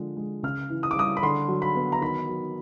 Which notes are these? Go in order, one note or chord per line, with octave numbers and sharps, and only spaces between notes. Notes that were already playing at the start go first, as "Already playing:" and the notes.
Already playing: D3 F3 G#3
G#3
C#3 F6
E3
D#6
D6
G3 D#6
B5
D3 C6
F#3
B5
B3
A#5
D#3 B5
F#3